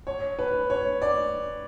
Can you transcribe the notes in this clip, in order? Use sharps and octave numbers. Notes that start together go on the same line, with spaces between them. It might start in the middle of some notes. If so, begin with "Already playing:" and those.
C#5
B4
C#5
D5